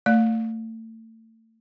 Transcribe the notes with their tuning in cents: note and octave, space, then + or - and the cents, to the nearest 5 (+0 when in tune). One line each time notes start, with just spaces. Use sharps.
A3 +30 D5 -15